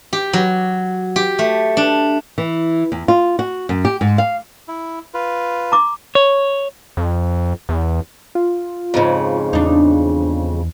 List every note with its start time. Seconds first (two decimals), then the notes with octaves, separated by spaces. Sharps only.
0.13 G4
0.33 F#3
1.16 G4
1.39 A3
1.77 D4
2.38 E3
2.92 E2
3.08 F4
3.39 F#4
3.69 F#2
3.85 G4
4.01 G#2
4.18 F5
4.68 E4
5.14 F4 B4
5.72 A#5 D6
6.15 C#5
6.97 F2
7.69 E2
8.35 F4
8.94 F2 G#2 C#3
9.53 E2 D4 D#4